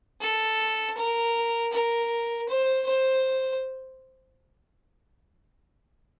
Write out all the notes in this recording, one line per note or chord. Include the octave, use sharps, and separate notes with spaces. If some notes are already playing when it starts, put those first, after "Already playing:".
A4
A#4
A#4
C5
C5